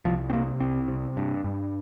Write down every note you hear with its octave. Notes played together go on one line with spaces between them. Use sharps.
C2 F3
C4
C3 A#3
C2 C4
C3
G2
G2